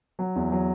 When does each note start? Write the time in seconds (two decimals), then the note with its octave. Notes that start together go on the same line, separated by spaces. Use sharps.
0.19 F#3
0.36 E2
0.52 F#3